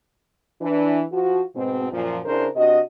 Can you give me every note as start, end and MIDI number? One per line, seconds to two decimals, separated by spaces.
0.61 1.03 52
0.61 1.03 62
1.12 1.41 53
1.12 1.41 66
1.56 1.87 44
1.56 1.87 47
1.56 1.87 60
1.92 2.19 42
1.92 2.19 46
1.92 2.19 53
2.25 2.48 49
2.25 2.48 62
2.25 2.48 64
2.25 2.48 70
2.25 2.48 72
2.55 2.80 48
2.55 2.80 62
2.55 2.80 66
2.55 2.80 75